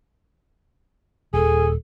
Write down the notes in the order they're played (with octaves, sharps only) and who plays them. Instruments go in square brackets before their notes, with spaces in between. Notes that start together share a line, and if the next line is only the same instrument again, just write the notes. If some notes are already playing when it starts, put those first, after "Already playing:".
[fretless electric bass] D#1 [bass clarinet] G#4 [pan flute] A4